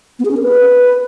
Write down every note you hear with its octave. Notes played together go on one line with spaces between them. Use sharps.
B3
G#4
C#4
A#4
B4